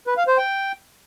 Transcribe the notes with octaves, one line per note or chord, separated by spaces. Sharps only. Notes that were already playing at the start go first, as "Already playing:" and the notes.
B4
F5
C5
G5